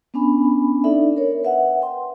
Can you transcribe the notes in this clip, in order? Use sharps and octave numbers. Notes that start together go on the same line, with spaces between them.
B3 C#4 D4 G#5 B5
D4 D#4 A4 D5 E5
A#4 C#5
B4 E5 F#5
G5 C6